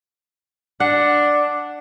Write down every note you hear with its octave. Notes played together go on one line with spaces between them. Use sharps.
D4 F#5